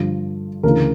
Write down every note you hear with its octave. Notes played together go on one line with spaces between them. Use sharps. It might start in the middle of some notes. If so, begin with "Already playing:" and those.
Already playing: G2 D3 F3
D2 C#3 E3 A#4